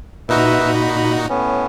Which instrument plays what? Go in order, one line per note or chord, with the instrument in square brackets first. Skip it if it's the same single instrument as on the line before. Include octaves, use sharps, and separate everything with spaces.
[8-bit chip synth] A#2 D#4 F#4 [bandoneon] B4 E5
[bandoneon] B5
A2 B3 C#4